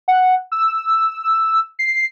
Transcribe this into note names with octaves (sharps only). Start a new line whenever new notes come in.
F#5
E6
C7